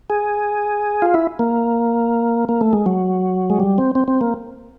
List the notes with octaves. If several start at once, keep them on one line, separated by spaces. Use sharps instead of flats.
G#4
F4
E4
A#3
A#3
A3
G#3
F#3
G#3
G3
C4
C4
C4
A#3